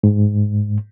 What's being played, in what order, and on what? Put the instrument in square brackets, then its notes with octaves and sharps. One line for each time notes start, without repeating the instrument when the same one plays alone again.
[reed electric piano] G#2